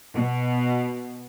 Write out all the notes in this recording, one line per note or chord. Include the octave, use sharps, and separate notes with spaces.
B2